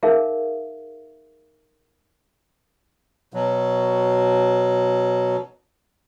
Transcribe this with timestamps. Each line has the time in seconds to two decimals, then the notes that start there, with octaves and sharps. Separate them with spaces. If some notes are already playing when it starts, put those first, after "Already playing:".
0.03 D#4 G#4 A#4 E5 F5
3.34 B2 F#3